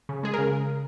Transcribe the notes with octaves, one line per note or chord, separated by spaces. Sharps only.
C#3
G#3 G#4
A#4
C#3